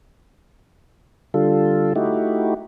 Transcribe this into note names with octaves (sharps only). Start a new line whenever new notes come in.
D3 G3 F4 A4
A3 D#4 E4 F#4 G4